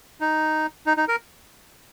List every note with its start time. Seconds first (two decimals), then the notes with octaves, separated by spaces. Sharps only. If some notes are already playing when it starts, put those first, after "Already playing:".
0.21 D#4
0.86 D#4
0.97 D#4
1.08 A#4